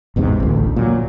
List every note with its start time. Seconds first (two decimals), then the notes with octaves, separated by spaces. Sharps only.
0.16 A1 E2 G#2 C3
0.40 A1 D2
0.76 A#2 F#3